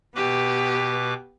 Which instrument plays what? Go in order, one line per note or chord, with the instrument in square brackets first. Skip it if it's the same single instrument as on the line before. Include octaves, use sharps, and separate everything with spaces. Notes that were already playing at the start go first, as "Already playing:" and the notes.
[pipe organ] B2 B4 D6 [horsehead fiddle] B3 G4